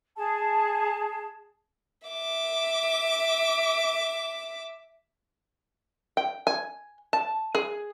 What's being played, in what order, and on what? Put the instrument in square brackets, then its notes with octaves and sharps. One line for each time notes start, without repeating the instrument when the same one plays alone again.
[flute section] G#4 A5
[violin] E5 D6
[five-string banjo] G5
G#5
A5
G#4